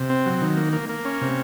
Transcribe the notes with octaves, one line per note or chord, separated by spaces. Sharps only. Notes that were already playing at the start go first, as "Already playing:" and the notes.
Already playing: C3
C4
F#3
D#3
A#3
A#3
A#3
C#4
C3